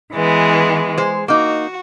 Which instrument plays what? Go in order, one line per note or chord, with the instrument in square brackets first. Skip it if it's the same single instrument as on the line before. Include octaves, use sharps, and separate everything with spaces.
[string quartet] E3 G#3 B3
[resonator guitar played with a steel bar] G#3 C5
[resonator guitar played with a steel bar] A#3 D#4 [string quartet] F#4